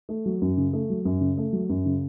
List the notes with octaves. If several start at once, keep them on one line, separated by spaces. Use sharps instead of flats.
A3
F#3
F#2
C#3
A3
F#3
F#2
C#3
A3
F#3
F#2
C#3